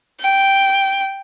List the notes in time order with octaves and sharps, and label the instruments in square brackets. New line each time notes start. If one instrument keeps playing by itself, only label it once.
[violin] G5